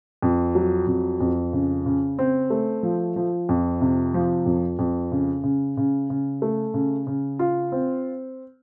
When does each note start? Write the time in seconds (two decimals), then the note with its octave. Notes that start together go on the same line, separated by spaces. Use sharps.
0.22 F2
0.55 F#3
0.87 F2
1.21 F2
1.53 C#3
1.86 C#3
2.19 C4
2.50 A3
2.83 F3
3.16 F3
3.49 F2
3.81 C3
4.14 F3
4.46 F2
4.79 F2
5.12 C#3
5.44 C#3
5.77 C#3
6.10 C#3
6.42 A3
6.74 C#3
7.07 C#3
7.39 F4
7.72 C4